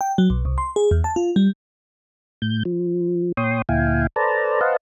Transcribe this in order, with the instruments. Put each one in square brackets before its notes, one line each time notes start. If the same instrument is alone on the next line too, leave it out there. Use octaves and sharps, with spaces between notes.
[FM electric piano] G5
F#3
B1
C2
C6
G#4
E2
A5
F4
G3
[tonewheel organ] A2 G6
F3
A#2 C#5 G5 C6 D#6
D2 A#2 E4 F5 G5 G#5
A4 B4 C5 D5 A5 A#5
B4 C5 D#5 F5 F#5 A5